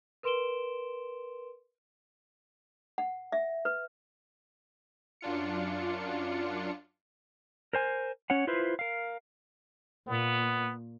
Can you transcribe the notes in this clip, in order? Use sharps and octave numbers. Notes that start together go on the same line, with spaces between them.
A#4 B4 C6 D7 E7 G7
F#5
E5
B4
F#2 D4 F4 C#7
A#4 C5 G#5
C#4 C#5 F#5
E4 F4 B4 C5 E5
A#4 F5
A#2 B3